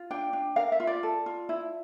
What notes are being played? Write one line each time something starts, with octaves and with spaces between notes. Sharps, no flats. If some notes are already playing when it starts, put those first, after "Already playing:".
Already playing: F4
D4 G5
D4
A#4 F5
E5
F4
D5
A4
F4
E4